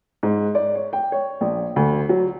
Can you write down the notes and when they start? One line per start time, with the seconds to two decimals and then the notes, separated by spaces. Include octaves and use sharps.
0.23 G#2
0.55 D5
0.75 C#5
0.93 G5
1.12 C#5
1.41 A#1
1.76 D2
2.09 F#3